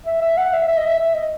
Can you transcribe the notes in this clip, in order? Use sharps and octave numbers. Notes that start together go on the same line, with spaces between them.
E5
E5
F#5
E5
E5
D#5
E5
E5
D#5